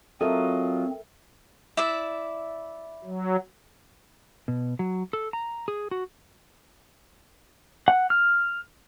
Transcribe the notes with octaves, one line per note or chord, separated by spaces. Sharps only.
F#3 C4 F4 A4 A#4 D#5 E5
E4 D5 E5
F#3
B2
F#3
A4
A#5
G#4
F#4
F#5
F6